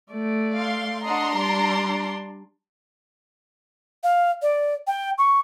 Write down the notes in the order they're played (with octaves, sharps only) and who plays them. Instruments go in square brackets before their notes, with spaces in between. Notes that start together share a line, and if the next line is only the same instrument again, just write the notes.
[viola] A3 D5
[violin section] F5 C6
[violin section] D4 A#5 C6 [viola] D#5 F#5
[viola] G3 D5
[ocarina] F5
D5
G5
C#6